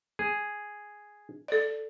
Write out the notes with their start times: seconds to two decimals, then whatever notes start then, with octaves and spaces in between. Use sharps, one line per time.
0.19 G#4
1.48 A4 D5